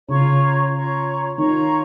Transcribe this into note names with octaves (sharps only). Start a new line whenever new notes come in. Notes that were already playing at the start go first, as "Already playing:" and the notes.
C#3 F4 C#5 A#5 C#6
F4 C#5 A#5 C#6
D#3 F4 C#5 A#5 C#6